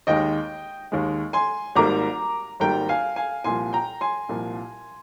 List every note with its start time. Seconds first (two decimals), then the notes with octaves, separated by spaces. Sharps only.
0.07 D#2 D#3 G#3 D#5 G5
0.92 D#2 D#3 G#3
1.33 G#5 C6
1.75 G#1 G#2 G3 A#3 A#5 D6
2.60 G#1 G#2 G3 A#3 G5 A#5
2.89 F5 G#5
3.16 F5 G#5
3.44 C2 A#2 F3 G#5 C6
3.73 G5 A#5
4.01 G#5 C6
4.29 C2 A#2 F3